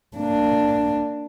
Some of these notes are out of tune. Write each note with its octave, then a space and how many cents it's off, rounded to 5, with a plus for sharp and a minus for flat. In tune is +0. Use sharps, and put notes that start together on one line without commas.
A#3 -25 D4 +0